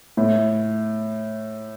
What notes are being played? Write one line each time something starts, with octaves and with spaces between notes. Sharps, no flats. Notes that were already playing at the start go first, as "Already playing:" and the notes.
A2